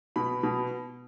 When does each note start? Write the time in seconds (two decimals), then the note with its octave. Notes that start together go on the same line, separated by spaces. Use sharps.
0.16 B2 B5
0.43 B2